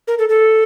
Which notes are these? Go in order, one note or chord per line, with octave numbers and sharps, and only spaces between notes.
A#4
A4
A4